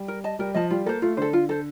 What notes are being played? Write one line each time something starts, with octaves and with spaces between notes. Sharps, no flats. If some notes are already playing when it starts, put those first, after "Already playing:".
Already playing: G3
A#4
D#5 A5
G3 A#4
F3 D#5 A5
G3 F4
A#3 A4 C5
A3 F4
D3 A4 C5
F4
A4 C5